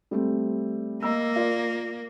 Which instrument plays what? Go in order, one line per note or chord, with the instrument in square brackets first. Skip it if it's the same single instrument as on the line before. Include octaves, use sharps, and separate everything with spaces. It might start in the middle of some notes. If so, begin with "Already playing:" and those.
[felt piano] G3 A3 C4
[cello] A#3 [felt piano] D#5 A#5 E6
[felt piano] F4 A#4 D5